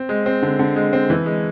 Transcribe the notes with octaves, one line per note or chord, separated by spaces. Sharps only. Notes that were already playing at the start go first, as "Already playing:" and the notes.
Already playing: C4
G#3
C4
D3
D3
G#3
C4
E3
G#3